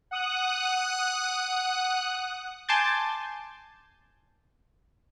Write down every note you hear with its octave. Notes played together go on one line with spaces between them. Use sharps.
F#5 D#6 F#6
G#5 A5 C6 D6 G6 A6